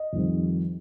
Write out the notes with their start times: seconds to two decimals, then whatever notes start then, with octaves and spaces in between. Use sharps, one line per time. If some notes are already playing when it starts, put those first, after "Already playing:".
Already playing: D#5
0.13 F2 D#3 G3 C4